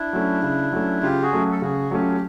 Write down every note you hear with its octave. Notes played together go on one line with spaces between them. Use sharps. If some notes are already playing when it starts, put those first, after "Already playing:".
Already playing: D4 E4
F#3 A3 C#4
C#3
F#3 A3 C#4
C#3 F4 G4
F#4 G#4
F#3 A3 C#4
A4
C#3 F#4 G#4
F#3 A3 C#4 F4 G4